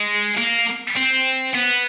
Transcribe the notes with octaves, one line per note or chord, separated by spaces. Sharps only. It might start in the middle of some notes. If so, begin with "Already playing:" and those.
Already playing: G#3
A#3
C4
B3